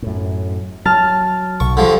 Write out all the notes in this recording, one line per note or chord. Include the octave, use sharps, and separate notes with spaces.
F#2 A2
F#3 A5 F6
B1 C#6
D3 F3 G3